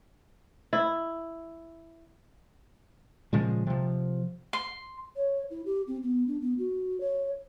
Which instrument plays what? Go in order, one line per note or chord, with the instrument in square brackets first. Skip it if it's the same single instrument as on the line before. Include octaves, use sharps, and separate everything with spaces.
[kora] E4
[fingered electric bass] A#2 C#3 F3 G#3
C3 F3
[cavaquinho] C6
[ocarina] C#5
E4
G4
C4
B3
D4
B3
F#4
C#5